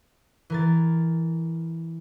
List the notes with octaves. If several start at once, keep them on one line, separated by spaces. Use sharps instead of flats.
E3 A#4 A6